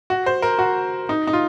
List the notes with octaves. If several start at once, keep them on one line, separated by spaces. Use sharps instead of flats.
F#4
C5
A#4
F#4
D#4
D#4
F4